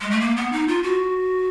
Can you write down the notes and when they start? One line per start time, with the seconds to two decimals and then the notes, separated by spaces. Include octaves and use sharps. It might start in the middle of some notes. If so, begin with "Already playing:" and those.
0.01 G#3
0.11 A3
0.20 A#3
0.36 B3
0.52 D#4
0.68 F4
0.83 F#4